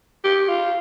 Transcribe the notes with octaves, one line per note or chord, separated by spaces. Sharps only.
G4
F4